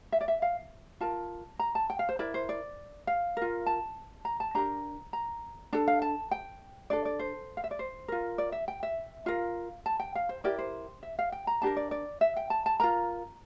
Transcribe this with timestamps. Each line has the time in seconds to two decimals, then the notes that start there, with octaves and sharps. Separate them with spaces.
0.12 E5
0.21 D5
0.28 E5
0.42 F5
1.01 F4 A#4 A5
1.59 A#5
1.75 A5
1.90 G5
1.99 F5
2.09 C5
2.19 E4 A#4 D5
2.34 C5
2.49 D5
3.07 F5
3.37 F4 A#4
3.66 A5
4.25 A#5
4.40 A5
4.55 D4 G4 A#4 A#5
5.13 A#5
5.73 D4 A4 A5
5.88 F5
6.02 A5
6.31 G5
6.90 D4 A4 D5
7.05 D5
7.19 C5
7.57 F5
7.64 E5
7.71 D5
7.79 C5
8.08 F4 A#4
8.38 D5
8.52 E5
8.68 G5
8.83 E5
9.26 F4 A#4 F5
9.86 A5
10.00 G5
10.15 F5
10.29 C5
10.44 E4 G4 A#4 D5
10.59 C5
11.03 E5
11.19 F5
11.32 G5
11.47 A#5
11.62 D4 G4 A#4 A5
11.77 D5
11.91 D5
12.21 E5
12.37 G5
12.50 A5
12.66 A5
12.80 F4 A#4 A#5